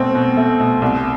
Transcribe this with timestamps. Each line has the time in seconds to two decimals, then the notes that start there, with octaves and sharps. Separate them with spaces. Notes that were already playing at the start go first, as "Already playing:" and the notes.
Already playing: B2 A3 C4
0.15 B2
0.37 A3
0.60 B2
0.82 C2